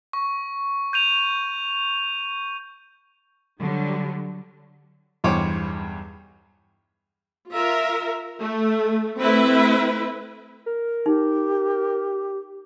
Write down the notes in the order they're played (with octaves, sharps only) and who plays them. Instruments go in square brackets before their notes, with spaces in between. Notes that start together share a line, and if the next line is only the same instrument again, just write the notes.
[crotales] C#6
G6 D#7 F7
[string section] D3 F#3 G3
[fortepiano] B1 E2 G2 C5 C#5 D6
[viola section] F4 A#4 E5
A3
A3 C4 E4 B4 E5
[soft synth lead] A#4
[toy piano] D#4 [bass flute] G4